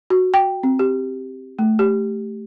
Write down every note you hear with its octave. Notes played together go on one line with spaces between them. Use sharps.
F#4
G5
C4
G4
A3
G4